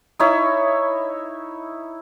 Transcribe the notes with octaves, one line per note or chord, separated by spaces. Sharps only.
D#4 E4 C#5